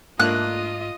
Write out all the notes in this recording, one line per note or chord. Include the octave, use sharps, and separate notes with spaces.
G#2 A3 A#3 D4 F4 D#5 F#6